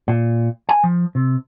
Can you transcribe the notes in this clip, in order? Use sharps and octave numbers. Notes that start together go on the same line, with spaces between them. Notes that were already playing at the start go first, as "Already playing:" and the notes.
A#2
G#5
F3
C3